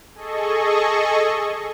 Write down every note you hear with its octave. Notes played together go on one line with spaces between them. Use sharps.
G#4 A4 D#5 C#6